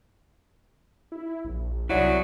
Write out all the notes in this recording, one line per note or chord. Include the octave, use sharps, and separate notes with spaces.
E4
A#1
C2 F#3 E4 D5